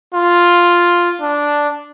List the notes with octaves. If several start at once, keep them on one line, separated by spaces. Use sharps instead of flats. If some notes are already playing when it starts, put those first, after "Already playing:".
F4
D4